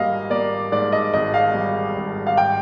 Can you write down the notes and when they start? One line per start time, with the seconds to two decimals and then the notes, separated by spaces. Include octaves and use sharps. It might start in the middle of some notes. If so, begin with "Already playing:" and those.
Already playing: G#1 G3 A#3 D#5 F5
0.30 A#3 D5
0.72 G#2 D5
0.92 D#5
1.13 G#1 D#5
1.34 F5
1.54 G3
1.96 G#1
2.27 F5
2.37 G5